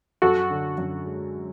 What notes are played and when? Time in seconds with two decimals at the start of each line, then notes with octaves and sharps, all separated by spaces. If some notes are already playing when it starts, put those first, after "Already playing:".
0.22 F#2 F#4 A4
0.50 D3
0.78 F#2
1.07 G#3